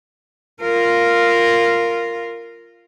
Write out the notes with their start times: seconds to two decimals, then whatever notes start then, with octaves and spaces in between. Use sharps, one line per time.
0.62 F4 A#4